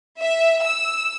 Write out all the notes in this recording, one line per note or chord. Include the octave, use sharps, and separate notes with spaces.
E5
E6